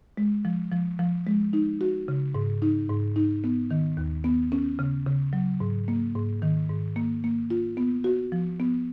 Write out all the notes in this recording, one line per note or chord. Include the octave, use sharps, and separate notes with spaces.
G#3
F3
F3
F3
G#3
D#4
F#4
C#3
G#2
D#4
G#2
D#4
B3
D#3
D#2
B3
C#4
C#3
C#3
F#3
G#2
A#3
G#2
D#3
G#2
A#3
A#3
F4
B3
F#4
F3
B3